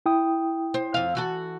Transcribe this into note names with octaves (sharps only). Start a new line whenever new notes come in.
E4 G5 D#6
C5
F2 F5
E3 F#4 A4